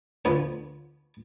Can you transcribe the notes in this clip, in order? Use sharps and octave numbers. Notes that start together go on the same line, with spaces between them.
D2 F3 B3 C#5 A5